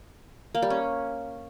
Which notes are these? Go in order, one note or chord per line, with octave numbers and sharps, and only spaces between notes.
A#3
G3
C#4